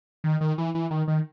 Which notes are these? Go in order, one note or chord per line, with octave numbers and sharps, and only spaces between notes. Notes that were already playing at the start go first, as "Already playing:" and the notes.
D#3
D#3
E3
E3
D#3
D#3